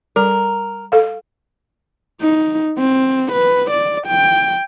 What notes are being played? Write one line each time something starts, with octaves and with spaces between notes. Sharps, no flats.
G3 A#4
A4 F5
D#4
C4
B4
D5
G5